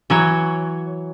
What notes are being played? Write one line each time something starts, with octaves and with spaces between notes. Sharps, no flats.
E3 F#3 C#5